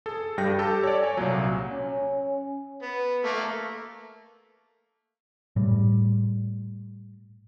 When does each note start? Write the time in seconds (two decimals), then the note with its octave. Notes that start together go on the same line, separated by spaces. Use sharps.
0.06 G#4 A4
0.38 G2 G3 G5 A#6
0.59 G4 A4 A5
0.83 C#5 D5
1.03 C#5 G#5
1.17 C2 A#2 F#3
1.71 C#4
2.82 B3
3.25 A3 A#3
5.56 A2 G3